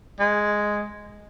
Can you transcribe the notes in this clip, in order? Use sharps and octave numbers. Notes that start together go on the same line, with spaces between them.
G#3